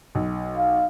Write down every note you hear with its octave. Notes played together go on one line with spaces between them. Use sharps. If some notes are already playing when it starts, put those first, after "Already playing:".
B1
F5